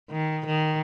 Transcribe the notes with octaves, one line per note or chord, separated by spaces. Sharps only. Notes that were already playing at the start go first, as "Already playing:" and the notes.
D#3
D#3